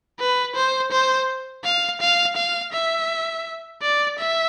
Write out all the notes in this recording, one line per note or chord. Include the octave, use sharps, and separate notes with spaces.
B4
C5
C5
F5
F5
F5
E5
D5
E5